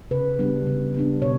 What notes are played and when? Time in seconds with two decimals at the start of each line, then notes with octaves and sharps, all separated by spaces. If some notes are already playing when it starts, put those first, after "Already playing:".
0.11 C#3 B4
0.39 G3 B3 D4
0.67 C#3
0.94 G3 B3 D4
1.22 B2 C#5